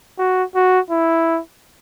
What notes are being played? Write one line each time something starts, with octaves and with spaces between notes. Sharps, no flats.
F#4
F#4
E4